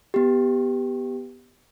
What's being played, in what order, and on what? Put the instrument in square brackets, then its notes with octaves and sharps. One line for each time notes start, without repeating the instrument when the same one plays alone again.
[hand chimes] B3 G4